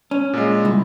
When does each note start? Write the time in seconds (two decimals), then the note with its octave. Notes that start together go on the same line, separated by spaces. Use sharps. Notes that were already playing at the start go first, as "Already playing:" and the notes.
0.11 C#4
0.33 A#2 G#3
0.65 C2